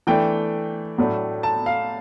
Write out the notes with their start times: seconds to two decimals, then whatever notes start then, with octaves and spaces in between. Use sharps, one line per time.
0.07 E3 A3 D4 G5
0.98 A2 F#3 A3 D4
1.43 A5
1.66 F5